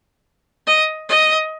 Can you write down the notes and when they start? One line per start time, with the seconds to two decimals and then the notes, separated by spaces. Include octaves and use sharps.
0.67 D#5
1.09 D#5